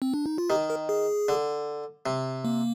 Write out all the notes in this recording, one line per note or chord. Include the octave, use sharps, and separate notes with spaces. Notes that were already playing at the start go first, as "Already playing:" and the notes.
C4
D4
D#4
F4
D#3 G4
A#4
G#4
D3
C3
A#3